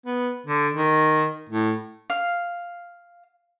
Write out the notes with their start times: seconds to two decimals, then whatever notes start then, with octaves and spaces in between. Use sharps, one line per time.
0.06 B3
0.47 D3
0.74 D#3
1.50 A2
2.10 F5